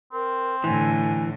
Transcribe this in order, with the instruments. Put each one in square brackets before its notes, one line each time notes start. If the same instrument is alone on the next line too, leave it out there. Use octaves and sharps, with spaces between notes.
[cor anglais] C4 [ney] A#4
[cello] A2 D3 [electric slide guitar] E3 [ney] G#5